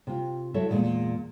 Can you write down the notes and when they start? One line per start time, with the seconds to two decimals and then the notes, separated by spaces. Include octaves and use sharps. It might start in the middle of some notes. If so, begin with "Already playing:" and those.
0.07 C3 F4
0.54 F#3 E4 F#4 A4 C#5 E5
0.69 E2 A#2 D#3 F#3 G#3 D5